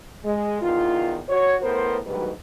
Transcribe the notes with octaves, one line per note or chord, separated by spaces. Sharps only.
G#3
E2 D#3 E3 F4
F#4 C#5
A2 B3 A#4 C5
D2 G#2 D#3 F#3 G3 B4